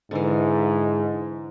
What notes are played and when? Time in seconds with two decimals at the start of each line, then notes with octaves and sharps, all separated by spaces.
0.11 G#2 D3 E3